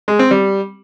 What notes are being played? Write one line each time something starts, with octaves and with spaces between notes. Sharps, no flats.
G#3
C4
G3